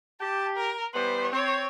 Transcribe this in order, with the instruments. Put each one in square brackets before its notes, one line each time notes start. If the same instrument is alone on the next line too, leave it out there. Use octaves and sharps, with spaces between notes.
[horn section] G4 [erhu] A5
[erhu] A#4
[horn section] E3 G3 B3 [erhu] C5
[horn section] C4 [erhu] C#5